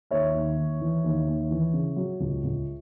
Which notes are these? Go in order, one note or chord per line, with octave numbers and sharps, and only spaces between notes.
D#2 C#5 E5
D#2
D#2
E3
D#2
D#2
E3
C#3
F#3
C#2
C#2